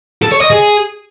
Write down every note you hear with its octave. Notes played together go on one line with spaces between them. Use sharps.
A4
C#5
D#5
G#4